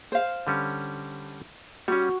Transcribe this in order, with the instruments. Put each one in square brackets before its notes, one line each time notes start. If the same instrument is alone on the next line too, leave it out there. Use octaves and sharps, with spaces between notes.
[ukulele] C5 F5
[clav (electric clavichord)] D3 G3 C#4
[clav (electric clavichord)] G3 C#4 [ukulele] F#4